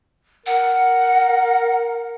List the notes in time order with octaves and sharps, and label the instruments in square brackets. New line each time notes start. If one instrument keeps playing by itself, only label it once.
[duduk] A#4 [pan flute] F#5